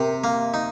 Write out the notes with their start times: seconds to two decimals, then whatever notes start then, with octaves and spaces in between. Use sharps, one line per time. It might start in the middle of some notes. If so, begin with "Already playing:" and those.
Already playing: C3 A#4
0.24 A#3
0.54 D#4